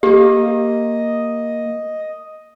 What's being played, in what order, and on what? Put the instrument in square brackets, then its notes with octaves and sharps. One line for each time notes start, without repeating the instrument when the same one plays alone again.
[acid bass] A#3 [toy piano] G4 [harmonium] D#5